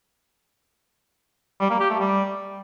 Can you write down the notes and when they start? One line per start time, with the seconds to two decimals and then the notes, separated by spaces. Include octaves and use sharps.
1.60 G3
1.70 A#3
1.80 G4
1.90 A3
2.00 G3